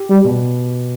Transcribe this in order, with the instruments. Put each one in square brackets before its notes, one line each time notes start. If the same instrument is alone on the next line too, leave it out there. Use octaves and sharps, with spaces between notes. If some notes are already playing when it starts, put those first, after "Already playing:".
Already playing: [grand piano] G4
[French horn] G3
[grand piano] B2